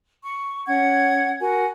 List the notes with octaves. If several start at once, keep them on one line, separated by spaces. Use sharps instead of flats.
C#6
C#4 F#5 G#6
F#4 A#4 G#5